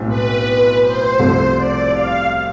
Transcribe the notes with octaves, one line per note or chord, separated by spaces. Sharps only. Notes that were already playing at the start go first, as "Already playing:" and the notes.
Already playing: B1 A2 G#3 C4
B4
C5
C2 C3 F3 A3
D5
F5